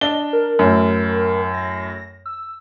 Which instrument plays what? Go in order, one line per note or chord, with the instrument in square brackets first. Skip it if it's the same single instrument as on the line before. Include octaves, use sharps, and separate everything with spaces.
[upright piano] D4 G7 [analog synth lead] D#5
[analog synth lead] A#4
[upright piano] F#2 A2
[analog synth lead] A#6
E6